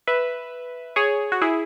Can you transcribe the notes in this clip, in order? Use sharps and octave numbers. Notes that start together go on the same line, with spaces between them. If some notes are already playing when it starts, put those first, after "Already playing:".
B4 E5
G#4 C#5
F#4
E4 G#4